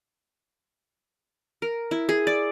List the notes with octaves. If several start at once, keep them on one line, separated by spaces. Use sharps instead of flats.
A#4
E4
G#4
D5